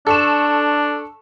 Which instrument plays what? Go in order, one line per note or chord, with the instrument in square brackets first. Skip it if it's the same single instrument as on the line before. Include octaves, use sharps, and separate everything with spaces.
[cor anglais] D4 [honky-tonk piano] A4 C#6 E7